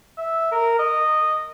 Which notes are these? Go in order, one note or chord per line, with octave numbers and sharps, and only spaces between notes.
E5
A#4
D#5